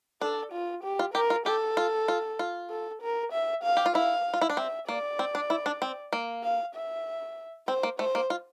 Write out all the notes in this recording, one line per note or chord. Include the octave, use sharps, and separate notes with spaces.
D4 A4
F4
G4
F4
G4 A#4
F4
G4 A4
F4
F4
F4
A4
A#4
E5
F5
G4
F4
E4 F5
F4
E4
D4
C4 E5
A#3 D5
C4
D4
E4
D4
C4
A#3
F5
E5
C4 C5
A#3
A3 C5
A#3
F4